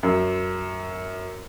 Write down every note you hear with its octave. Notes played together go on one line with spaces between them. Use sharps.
F#2